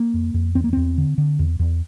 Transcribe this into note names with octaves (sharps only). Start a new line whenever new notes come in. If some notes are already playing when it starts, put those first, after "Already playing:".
Already playing: A#3
F2
F2
E2 C4
A#3
E2 C4
D3
D3
E2
E2